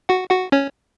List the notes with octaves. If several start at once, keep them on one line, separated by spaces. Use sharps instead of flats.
F#4 F#5
F#4 F#5
C#4 C#5